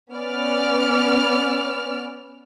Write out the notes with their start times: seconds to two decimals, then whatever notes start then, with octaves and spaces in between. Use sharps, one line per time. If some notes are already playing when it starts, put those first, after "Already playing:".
0.13 B3 C#4 D5 F6